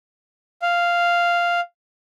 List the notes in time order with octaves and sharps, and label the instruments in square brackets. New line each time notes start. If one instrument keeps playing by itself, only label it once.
[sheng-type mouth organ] F5